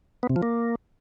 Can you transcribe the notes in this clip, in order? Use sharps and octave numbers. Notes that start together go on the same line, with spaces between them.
B3
C3
F3
A#3